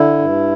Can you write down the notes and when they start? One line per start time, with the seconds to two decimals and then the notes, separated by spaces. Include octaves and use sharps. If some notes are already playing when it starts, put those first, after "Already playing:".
Already playing: D3 E4
0.19 G2